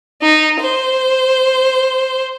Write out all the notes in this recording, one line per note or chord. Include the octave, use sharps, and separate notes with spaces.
D#4
C5